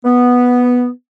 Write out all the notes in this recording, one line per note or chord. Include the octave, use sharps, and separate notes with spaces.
B3